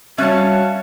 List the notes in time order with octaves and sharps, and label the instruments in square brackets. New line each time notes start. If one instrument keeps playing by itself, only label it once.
[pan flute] G3 [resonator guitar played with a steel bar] C#4 A5 [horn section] F#4 C#5 F5 [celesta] E5 F#6